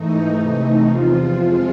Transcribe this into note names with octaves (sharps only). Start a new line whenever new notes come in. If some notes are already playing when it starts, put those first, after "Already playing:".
Already playing: G#2 E3 A3 D#4
C3 E3 A3 D#4
E2 C3 F3 F4
F2 C3 F3 G#3